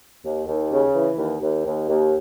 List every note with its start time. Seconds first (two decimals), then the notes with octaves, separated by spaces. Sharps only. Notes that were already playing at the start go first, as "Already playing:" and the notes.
0.25 D#2
0.48 D#2
0.72 C#3
0.95 E3
1.18 D#2
1.42 D#2
1.66 D#2
1.89 D#2